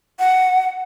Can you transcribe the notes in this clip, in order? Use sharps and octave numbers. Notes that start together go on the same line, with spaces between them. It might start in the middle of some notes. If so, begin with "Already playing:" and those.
F#5